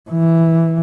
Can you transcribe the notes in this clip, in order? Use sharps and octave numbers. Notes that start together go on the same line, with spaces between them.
E3